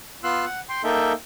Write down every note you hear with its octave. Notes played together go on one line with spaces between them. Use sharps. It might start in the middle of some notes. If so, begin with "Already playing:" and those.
B3 F4 C6 E6 F#6
F#5
G5 C6
A#3 D#4 A4 E5 G5